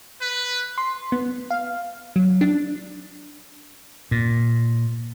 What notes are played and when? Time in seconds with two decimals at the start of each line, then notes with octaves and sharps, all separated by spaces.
0.20 B4
0.78 C6
1.12 B3
1.51 F5
2.16 F#3
2.41 D4
4.11 A#2